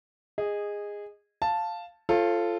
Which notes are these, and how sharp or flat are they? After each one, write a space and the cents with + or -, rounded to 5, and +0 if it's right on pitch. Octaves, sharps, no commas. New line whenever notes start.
G#4 -15 D#5 -5
F5 +0 A5 +0
F4 -15 A4 +0 C5 +45